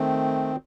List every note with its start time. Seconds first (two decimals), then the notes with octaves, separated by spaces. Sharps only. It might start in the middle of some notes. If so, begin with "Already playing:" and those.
Already playing: D#3 A3 C4